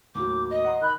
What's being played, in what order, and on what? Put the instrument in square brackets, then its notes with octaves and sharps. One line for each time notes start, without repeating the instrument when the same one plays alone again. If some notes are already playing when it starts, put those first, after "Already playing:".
[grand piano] D#2 A2 F#3 [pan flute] D6 [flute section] G6
[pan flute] D#5 [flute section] D#6
[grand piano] F#5 A#5 C6
[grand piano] D#3 G6 [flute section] B5 F#6